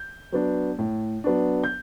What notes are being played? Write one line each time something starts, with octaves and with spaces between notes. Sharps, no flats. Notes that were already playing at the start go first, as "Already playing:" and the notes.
Already playing: G6
F#3 B3 D4
A2
F#3 B3 D4
G6